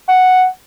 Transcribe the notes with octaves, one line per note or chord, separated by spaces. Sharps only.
F#5